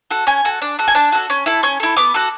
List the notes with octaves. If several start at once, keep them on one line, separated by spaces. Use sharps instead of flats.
F#4 A4
C#4 G#5
F#4 A4
D4
F#4 A4
G#5
D4 A5
F#4 A4
C#4
E4 A4
C#4 C#6
E4 A4
B3 D6
F#4 A4